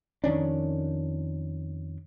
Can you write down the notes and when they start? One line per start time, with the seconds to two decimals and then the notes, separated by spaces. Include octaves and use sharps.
0.24 F2 D#3 C#4 D4